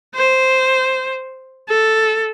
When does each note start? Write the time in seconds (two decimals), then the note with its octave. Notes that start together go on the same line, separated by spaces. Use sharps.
0.15 C5
1.69 A4